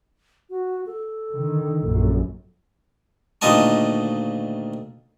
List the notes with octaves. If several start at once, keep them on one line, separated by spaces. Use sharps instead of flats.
F#4
A4
D3 D#3
A#1 F#2
D2 A#2 D#3 D#5 A5 C#6